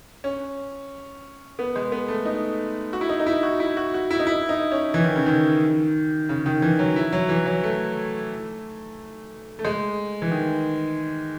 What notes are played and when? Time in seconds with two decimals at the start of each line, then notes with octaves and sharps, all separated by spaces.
0.24 C#4
1.59 B3
1.76 G#3
1.92 B3
2.08 A3
2.25 D#4
2.93 F#4
3.01 E4
3.09 D#4
3.19 D#4
3.26 E4
3.43 F#4
3.60 E4
3.77 F#4
3.94 F#4
4.11 E4
4.19 D#4
4.27 E4
4.49 D#4
4.72 C#4
4.94 E3
5.04 D#3
5.16 C#3
5.26 D#3
6.29 C#3
6.46 D#3
6.62 E3
6.79 F#3
6.96 E4
7.12 F#3
7.29 E3
7.46 F#3
7.64 A3
9.59 A3
9.65 G#3
10.22 E3
10.31 D#3